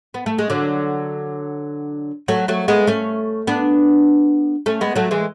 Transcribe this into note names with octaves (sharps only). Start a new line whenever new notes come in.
B3
A3
G#3
D3 F#3
F#3 A3
F#3 A3
G#3 B3
A3 C#4
B3 D4
A3 C#4
G#3 B3
F#3 A3
E3 G#3